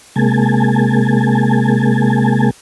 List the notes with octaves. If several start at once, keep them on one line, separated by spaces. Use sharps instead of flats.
C3 G#3 A#3 G#5 A5